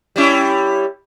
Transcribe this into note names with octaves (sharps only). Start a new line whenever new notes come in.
G3 C#4 E4